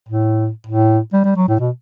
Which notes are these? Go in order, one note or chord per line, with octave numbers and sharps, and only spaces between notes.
A2
A2
G3
G3
F#3
A2
B2